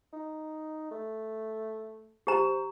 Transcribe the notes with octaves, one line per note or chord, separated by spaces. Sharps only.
D#4
A3
G4 C5 A#5